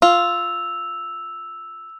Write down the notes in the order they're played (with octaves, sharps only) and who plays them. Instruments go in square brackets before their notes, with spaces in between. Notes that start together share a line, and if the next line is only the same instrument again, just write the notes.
[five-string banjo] F4 [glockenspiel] E6 F7